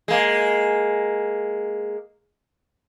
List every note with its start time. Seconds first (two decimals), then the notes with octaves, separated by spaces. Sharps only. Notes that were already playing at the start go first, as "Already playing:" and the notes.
0.08 G#3 A#3